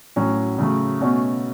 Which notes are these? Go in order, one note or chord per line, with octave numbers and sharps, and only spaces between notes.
A2 F#3 C#4 F#4
C#3 F#3 A3
B2 A3 C#4 F#4